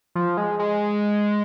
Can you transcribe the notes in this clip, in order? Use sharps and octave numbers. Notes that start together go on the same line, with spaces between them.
F3
G#3
G#3